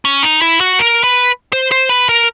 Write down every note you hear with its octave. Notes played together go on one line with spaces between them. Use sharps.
C#4
D#4
E4
F#4
A#4
B4
C5
C5
B4
A#4